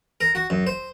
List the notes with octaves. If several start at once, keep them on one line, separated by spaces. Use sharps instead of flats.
A#4
F#4
F#2
C5